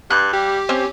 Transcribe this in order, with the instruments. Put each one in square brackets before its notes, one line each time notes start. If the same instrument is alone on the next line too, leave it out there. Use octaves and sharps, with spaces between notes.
[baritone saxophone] G2 [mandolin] F#6
[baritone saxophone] G3 [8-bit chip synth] G4
[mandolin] C4 [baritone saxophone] C#4